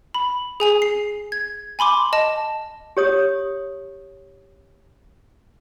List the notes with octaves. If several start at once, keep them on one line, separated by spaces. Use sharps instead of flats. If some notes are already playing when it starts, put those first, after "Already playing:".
B5
G#4 G#5 F7
C7
G#6
G#5 B5 C6 D6
D#5 A5
G4 C#5 D#6